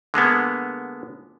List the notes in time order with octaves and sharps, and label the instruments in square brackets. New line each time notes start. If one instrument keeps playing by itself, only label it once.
[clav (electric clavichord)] D3 G#3 A#3 B3